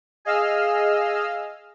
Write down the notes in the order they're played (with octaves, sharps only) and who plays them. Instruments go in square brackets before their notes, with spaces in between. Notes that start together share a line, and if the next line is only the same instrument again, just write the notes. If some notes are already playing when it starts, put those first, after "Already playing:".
[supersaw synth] G#4 D#5 F5 E6 F6